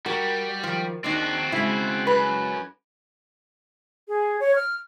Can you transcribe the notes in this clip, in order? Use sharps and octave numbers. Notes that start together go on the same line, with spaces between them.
G3 F#4 A#4
D#3 F3
D#2 C4 D4 D#4 F#4
C#3 G#3 E4
F#2 B4
G#4
C#5
F6